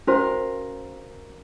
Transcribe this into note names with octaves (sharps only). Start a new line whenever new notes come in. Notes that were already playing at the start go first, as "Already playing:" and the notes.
C#4 F#4 A#4 C5 F5